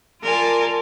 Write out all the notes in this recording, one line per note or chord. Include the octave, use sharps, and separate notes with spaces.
F4 A#4 D5 G#5 A5